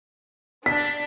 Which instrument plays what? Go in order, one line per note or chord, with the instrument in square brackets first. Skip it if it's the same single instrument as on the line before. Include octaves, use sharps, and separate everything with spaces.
[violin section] D4 [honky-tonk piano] B6